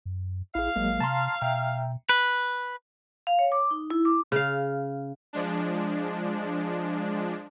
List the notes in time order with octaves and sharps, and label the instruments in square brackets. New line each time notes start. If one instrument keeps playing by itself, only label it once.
[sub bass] F#2
[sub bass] A1 [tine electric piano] E4 G#4 [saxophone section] F5
[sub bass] G#1 [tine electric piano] F#3 G#3 A#3
[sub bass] C3 [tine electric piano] A5 A#5 C6
[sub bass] B2 [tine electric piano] E5 G5 A#5
[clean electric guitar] B4
[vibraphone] F5
C#5
D6
D#4
E4
D6
[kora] C#3 F5
[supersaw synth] F3 G#3 D4